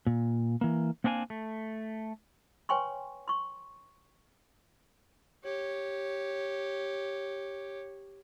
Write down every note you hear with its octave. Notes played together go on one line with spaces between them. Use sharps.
A#2
E3 A#3
A#3 C4 D4 F5 G#5
A3
B4 C#5 G5 G#5 C6 C#6
C6 C#6
G4 C#5